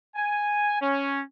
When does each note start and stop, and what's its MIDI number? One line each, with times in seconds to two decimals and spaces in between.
0.16 0.77 80
0.81 1.21 61